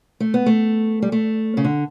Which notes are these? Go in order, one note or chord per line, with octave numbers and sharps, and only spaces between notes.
A3
B3
A3
G3
A3
C#3
D3